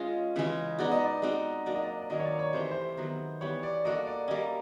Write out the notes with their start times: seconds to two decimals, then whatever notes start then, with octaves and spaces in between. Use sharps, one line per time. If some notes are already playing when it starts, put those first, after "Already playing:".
Already playing: G#3 C#4 F4 D#5
0.36 C#3 E3 G#3 C#4
0.79 G#3 B3 D#4 F#4 D5
0.91 D#5
1.05 D5
1.22 G#3 C4 D#4 F#4
1.66 F#3 A#3 D4 D5
1.75 D#5
1.84 D5
2.01 D5
2.10 D#3 F#3 A#3 C#4 D#5
2.19 C#5
2.25 D5
2.39 C#5
2.53 C3 E3 A3 C5
2.71 C5
2.97 D#3 F#3 B3
3.41 E3 G3 B3 C#5
3.63 D5
3.84 A#3 D4 F#4 A4 D#5
4.07 D5
4.28 G3 A#3 C#4 D#5